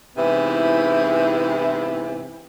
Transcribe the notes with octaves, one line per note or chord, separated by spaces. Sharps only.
G#2 C3 E3 B3 E4